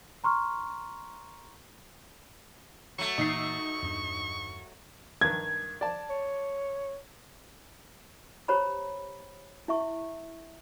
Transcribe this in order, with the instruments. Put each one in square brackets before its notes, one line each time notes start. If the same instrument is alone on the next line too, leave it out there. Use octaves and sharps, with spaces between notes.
[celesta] A#5 C6 C#6 F6
[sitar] F#3 A3 [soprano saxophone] C#6
[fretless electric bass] A#2 E3 A#3 [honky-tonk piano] D#4 C7
[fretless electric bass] E2 G2 D4
[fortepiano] G2 D#3 [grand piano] G#6
[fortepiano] D5 A5
[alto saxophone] C#5
[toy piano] G4 C5 C#5 A#5 B5
E4 E5 C#6